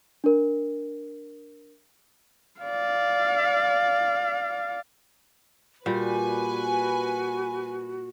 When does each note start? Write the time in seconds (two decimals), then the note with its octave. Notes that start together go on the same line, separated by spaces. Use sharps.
0.24 D4 A#4
2.60 D5 F5
5.86 A#2 G3 F#4 B4 G#5